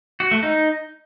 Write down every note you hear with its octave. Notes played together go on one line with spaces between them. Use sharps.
F#4
A3
D#4